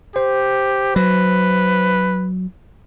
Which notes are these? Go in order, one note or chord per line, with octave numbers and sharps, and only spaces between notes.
G4 C5
F#3 B4